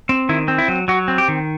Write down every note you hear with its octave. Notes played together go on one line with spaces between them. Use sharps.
C4
D#3 E4
C4
E4
F#3
F#3 F#4
C4
G4
D#3